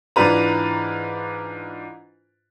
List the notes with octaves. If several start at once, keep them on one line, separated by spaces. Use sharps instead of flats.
G#2 E3 D4 F4 B4 A#5